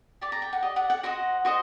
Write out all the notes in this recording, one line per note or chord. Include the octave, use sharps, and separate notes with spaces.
G4 D5 D6
A#5
G5
F#5
G4 D5 D#5
F#5
F#5
F#4 C5 D#5 F#5
F#4 C5 D#5